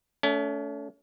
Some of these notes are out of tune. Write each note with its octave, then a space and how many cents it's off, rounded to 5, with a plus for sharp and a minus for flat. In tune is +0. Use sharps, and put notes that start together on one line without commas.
A3 +0 C#4 +35